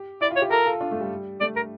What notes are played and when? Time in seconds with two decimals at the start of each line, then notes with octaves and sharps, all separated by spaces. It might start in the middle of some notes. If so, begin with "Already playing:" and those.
Already playing: G4
0.21 E4 D5
0.31 F4
0.36 C#5
0.42 G4
0.51 F4 A4 A#4
0.66 F4 A4
0.80 D4 F4
0.91 A3
1.01 G3
1.40 A3 D5
1.56 A#4